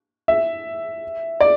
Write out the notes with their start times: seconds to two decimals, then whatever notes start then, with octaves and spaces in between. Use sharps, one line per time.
0.28 E5
1.41 D5